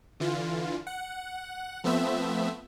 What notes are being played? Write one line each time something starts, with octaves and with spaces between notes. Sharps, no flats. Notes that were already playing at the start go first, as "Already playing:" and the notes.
D3 E3 F4
F#5
F3 A3 B3 C4 E5